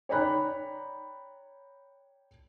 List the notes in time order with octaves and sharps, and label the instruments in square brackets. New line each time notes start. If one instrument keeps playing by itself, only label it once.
[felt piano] C#5 D5 G5 A#5 B5 F#6